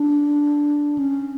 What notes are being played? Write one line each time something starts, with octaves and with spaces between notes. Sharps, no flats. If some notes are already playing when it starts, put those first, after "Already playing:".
Already playing: D4
C#4